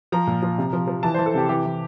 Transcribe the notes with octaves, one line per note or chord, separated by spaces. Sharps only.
F3 A#5
A#2
F3
C3
F3
F3
E3 A5
E3 C5
A4
C3 G4
E3 G4
E3